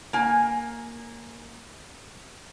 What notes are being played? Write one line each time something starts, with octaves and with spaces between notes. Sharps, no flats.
A#3 G#5